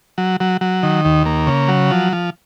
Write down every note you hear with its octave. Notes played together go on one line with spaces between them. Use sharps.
F#3
F#3
F#3
D#3
D#2
A#3
C#3
F#3
F3
F3